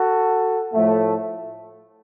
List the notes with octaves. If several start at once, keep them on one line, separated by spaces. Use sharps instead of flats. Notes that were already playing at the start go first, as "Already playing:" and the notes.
Already playing: F#4 A4
A2 F3 A3